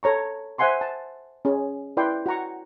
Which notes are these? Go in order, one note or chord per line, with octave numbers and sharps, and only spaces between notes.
A4 C#5 A#5 C#6
C5 E5 F#5 G#5 C6 C#6
A5
C#4 G#4
E4 B4 D5 G5 C6
F#4 F#5 A#5 C#6